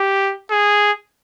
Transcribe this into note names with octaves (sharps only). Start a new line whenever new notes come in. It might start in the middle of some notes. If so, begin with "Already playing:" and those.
Already playing: G4
G#4